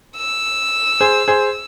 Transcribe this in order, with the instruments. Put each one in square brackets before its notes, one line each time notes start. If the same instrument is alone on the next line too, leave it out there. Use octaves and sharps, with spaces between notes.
[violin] E6
[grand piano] G#4 C5
G#4 C5